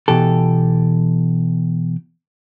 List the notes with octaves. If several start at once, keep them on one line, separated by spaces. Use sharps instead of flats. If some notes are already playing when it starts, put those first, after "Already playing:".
B2 E3 G4 A4